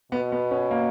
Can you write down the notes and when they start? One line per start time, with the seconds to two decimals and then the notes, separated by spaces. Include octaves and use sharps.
0.12 B2 B3
0.32 B3
0.51 C#4
0.71 A#3